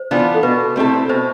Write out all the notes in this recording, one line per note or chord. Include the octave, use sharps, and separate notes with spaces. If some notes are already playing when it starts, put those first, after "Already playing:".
Already playing: C5
E3 B3 D4 F4
A4
B2 B4
A3 C4 E4 A4
B2 C5